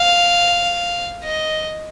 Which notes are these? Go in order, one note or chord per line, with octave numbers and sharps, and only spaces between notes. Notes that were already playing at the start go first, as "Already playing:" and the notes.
Already playing: F5
D#5